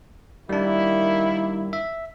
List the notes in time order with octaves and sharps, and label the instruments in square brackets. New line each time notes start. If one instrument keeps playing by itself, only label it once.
[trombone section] D#3 A#3 E4 [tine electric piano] G3 D4
[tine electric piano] E5